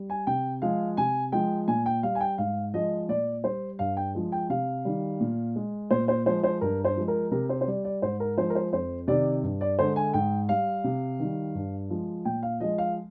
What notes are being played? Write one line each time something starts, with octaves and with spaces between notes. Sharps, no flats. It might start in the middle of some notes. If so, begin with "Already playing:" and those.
Already playing: G3
G#5
C3 G5
F3 G#3 F5
C3 G#5
F3 G#3 G5
A#2 G#5
G5
G3 F5
G#5
G5
G#2 F5
F3 G#3 D#5
A#2 D5
G3 C5
G2 F5
G5
F3 G#3
G5
C3 F5
D#3 G3
A#2
G#3
A#2 C5
C5
F3 G#3 C5
C5
G2 A#4
C5
F3 G#3
A#4
C3 A#4
C5
C5
G3 D5
D5
G#2 C5
A#4
F3 G#3 C5
A#4
C5
F2 C5
C3 D#3 D5
G2
D5
D3 G#3 C5
G#5
G#2 G5
G3 F5
C3
D#3 G3
G2
F3 G#3
A#2 G5
F5
F3 G#3 D#5
F5